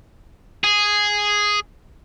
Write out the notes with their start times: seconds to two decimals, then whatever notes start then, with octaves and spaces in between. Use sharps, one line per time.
0.64 G#4